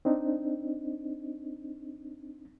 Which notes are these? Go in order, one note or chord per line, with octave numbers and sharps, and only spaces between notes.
C4 D4 D#4